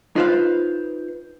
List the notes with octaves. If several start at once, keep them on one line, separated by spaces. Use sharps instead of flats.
D#4 F4 B4 C5 F5